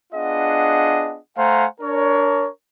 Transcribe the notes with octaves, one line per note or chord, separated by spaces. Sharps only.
B3 D4 F4 G#4 D#5 F#5
A3 C5 F5 F#5 G#5 A#5
D4 A#4 C#5